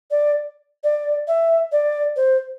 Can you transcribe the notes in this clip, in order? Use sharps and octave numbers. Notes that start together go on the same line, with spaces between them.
D5
D5
E5
D5
C5